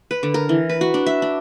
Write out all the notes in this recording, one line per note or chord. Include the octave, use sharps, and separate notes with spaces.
B4
D3
A#4
E3
B4
F#4
D4
E5
D4